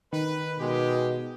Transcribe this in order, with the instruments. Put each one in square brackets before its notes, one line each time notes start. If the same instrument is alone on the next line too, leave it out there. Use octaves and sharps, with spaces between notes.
[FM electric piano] D#3 [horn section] B4
[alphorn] B2 [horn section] G#3 G4